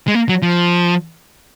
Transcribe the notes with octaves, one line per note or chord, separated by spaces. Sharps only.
G#3
A#3
F#3
F3